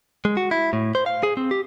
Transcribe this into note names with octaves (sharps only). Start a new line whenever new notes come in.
G#3
F#4
E4
A2
C5
F5
G#4
C4
G4